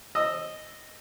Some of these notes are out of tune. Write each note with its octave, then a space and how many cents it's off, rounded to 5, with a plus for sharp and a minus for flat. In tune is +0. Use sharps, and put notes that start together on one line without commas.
D#5 -10 E6 +0